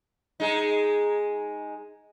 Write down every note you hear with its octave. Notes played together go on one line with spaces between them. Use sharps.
G#3 D#4